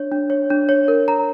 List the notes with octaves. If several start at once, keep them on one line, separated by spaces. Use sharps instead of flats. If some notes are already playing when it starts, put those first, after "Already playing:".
Already playing: D4 C#5
D4
C#5
D4
C#5
A#4
A#5